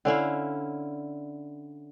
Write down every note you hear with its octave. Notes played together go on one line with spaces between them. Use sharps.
D3 C#4 E4 F5